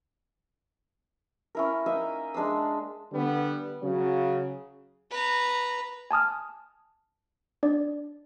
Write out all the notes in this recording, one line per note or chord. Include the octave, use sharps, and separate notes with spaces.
C#4 E4 A#4
A#3 D#4 D#5 E5
G#3 D4 C6 E6
D3 G3 B3
C#3 F#3
B4 A#5
G#5 A5 D#6 F6
D4 D5